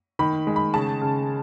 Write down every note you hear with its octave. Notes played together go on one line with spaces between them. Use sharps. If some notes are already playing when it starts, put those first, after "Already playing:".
D#3 B5
G#3
B5
C#3 A5
C#3